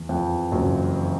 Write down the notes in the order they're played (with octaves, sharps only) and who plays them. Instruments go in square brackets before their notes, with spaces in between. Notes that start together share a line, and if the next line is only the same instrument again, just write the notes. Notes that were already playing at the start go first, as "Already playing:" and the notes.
Already playing: [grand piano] E2
F2
F#1 F#2